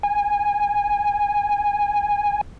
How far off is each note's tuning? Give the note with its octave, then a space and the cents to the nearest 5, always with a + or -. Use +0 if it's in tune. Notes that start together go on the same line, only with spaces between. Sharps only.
G#5 -15